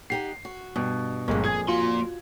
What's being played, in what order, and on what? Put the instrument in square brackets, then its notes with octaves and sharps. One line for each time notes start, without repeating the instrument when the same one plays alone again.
[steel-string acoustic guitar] D#4 G4 F#5 [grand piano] C7
[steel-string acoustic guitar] F#4
[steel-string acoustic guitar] G2 [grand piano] B2
[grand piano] G1 G#3 [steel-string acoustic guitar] F2 A#2 [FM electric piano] A#3
[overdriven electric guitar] G#4 [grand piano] G#5 G#6
[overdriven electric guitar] A#3 C6 [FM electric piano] F4 F#4